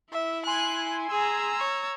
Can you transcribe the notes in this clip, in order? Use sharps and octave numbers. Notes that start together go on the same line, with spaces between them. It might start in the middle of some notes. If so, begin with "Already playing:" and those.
E4 E5
G#5 C6 F#6
G#4 A#5 E6
C#5